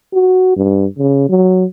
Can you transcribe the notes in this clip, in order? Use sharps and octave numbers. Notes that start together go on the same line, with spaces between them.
F#4
G2
C#3
F#3